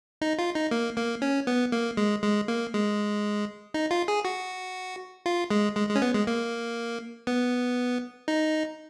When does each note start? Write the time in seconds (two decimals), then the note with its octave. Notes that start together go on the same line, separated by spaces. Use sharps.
0.22 D#4
0.39 F4
0.55 D#4
0.71 A#3
0.97 A#3
1.22 C#4
1.47 B3
1.72 A#3
1.97 G#3
2.23 G#3
2.48 A#3
2.74 G#3
3.74 D#4
3.91 F4
4.08 G#4
4.25 F#4
5.26 F4
5.50 G#3
5.76 G#3
5.89 G#3
5.96 C#4
6.02 B3
6.14 G#3
6.27 A#3
7.27 B3
8.28 D#4